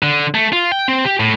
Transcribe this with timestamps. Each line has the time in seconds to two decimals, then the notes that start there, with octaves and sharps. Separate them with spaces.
0.03 D3
0.35 A3
0.53 F4
0.72 G5
0.88 C4
1.05 G4
1.20 A2